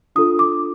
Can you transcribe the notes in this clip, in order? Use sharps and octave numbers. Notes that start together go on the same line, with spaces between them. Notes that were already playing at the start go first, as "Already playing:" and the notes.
D4 F4 A4 D#6
D6